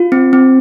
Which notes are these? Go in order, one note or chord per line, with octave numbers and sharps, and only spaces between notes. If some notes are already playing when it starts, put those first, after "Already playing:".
Already playing: F4
C4
C4